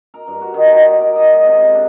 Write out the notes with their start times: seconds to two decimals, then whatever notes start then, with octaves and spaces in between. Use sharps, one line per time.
0.14 A#4
0.28 G2
0.41 F#4
0.54 D#3
0.67 B2
0.79 D5
1.01 A#4
1.16 D#5
1.32 G#3
1.45 C3
1.61 F5
1.74 D4